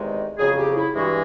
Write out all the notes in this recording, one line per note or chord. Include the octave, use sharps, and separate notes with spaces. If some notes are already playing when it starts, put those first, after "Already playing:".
Already playing: E2 C3 D#3 G#3
F2 C#3 F#3 G#4
G4
E4
G2 E3 G#3 F#4